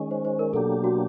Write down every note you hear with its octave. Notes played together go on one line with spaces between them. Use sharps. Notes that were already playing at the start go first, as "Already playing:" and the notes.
Already playing: D#3 G#3 C#4
C5
C5
A#4
B2 F#3 A#3 D4 G4 A4
F#4